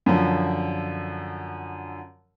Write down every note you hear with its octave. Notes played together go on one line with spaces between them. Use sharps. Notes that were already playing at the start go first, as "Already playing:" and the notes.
F#2 D3 F3